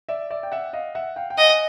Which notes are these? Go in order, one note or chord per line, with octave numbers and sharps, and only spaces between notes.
D5 E5
D5 E5
G5
E5 F#5
D#5 F5
E5 F#5
F5 G5
G5
D#5 F#5 G#5